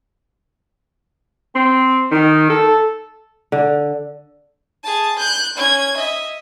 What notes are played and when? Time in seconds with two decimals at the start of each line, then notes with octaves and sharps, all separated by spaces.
1.55 C4
2.11 D#3
2.50 A4
3.52 D3
4.83 G#4 A5
5.18 F#6 G6
5.57 C#4 G#6
5.97 D#5 E5